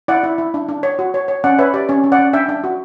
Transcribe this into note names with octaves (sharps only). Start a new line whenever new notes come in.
E4 D5 F#5
E4
E4
D4
D4
C#5
F#4
C#5
C#5
C#4 D5 F#5
B4 C#5 E5
G4 D5
C#4 C#5
C#4
D5 F#5
C#4
D4 E5 G5
D4
F#4